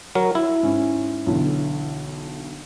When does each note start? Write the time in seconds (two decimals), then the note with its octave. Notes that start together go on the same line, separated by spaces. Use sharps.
0.15 F#3 A#4
0.35 E4
0.63 G#2 C#4
1.27 B1 D3 E3